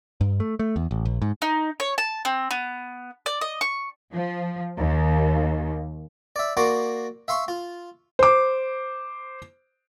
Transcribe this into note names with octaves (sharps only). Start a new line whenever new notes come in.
G2
A3
A3
E2
A1
A#1
G#2
D#4
C#5
A5
C4
B3
D5
D#5
C#6
F3
D#2
D5 E5
A#3 F#4 D5 C6 D6
E5 F5 C6 C#6
F4
C5 D6